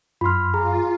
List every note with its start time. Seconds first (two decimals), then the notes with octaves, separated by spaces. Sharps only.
0.21 F#2 F4 B5 C6 F6
0.54 F4 G#4 A#5